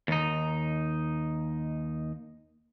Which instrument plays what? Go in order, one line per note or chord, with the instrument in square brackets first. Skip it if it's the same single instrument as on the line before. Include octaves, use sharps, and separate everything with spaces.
[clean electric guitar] D#2 D#4